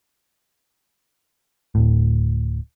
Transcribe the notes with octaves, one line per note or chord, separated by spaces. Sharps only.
D1 A2